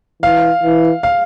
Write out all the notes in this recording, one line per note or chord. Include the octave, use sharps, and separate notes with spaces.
E3 F5
E3
F5